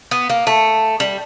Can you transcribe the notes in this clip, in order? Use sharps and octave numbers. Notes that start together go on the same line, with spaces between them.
B3
A#3
A3
G3